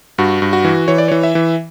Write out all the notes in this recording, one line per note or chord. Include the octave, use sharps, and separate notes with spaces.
G2 F#4
G2
F#4
E3
E3 C#5
D5
E3 C#5
E5
E3